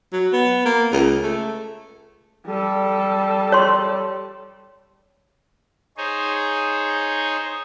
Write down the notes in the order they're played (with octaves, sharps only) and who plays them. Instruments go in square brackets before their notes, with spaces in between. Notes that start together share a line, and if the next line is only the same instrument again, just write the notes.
[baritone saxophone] F#3
B3
A#3
C#2
A3
[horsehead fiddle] G3 A4
[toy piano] C#5 C6
[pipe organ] D#4 G#4 C5 C#5